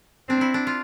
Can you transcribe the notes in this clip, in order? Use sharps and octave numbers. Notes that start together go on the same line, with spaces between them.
C4 D4
E4
D4
F4